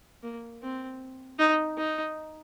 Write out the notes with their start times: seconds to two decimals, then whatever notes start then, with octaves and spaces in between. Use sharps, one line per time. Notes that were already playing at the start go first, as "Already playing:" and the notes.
0.23 A#3
0.62 C4
1.39 D#4
1.77 D#4